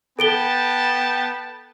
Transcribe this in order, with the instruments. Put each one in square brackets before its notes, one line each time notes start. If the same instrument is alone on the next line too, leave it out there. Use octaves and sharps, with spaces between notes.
[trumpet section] B3 G5 A5 [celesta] A4 D7 G7